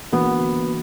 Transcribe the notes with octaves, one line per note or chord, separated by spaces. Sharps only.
E3 A#3 B3 D4 F#4